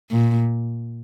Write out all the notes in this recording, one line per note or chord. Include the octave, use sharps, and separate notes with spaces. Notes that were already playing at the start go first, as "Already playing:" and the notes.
A#2